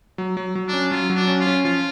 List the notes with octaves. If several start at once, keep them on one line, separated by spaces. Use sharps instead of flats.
F#3
F#3
F#3
D4
C#4
F#3 F4
F#3
D4
C#4
F4
C#4
F3 F4